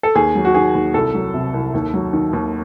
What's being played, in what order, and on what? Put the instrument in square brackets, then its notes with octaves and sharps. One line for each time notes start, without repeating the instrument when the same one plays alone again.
[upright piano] A4
D#2 G#4
F#3
F#4
D#3 G#4
D#2
C2 A4
F#3
C3
C2
D#2
F#3
D#3
D#2